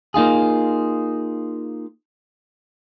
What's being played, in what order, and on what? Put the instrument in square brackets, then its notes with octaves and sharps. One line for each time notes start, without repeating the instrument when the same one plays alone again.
[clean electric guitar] A#3 D#4 F4 G#4